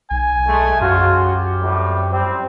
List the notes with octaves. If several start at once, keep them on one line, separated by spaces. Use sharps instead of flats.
B1 G#5
G#3 A3
F#2 C#3 F4 F#4
G4
F2 A2 G3
G3 C4